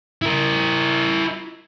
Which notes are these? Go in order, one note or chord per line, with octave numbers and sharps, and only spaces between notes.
E4 A#4